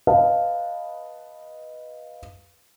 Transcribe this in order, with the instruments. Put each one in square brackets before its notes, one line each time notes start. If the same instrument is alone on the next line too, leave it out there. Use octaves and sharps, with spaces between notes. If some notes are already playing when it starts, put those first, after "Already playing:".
[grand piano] B4 D#5 F5 A5